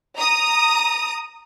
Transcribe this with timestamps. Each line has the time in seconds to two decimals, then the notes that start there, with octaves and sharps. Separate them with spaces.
0.18 A#5 D#6